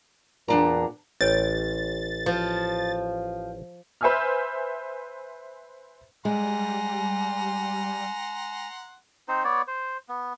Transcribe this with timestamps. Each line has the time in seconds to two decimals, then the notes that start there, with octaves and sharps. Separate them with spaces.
0.48 E2 A#2 D4 A#5
1.21 A1 C#5 G5 A6
2.26 F3
4.01 B4 C5 E5 G#5 E6 F6
6.25 G3 G#3 F#5 G#5 A#5 C6
9.28 C4 D#4 C5
9.44 B3 C#5 D5
9.68 C5
10.09 B3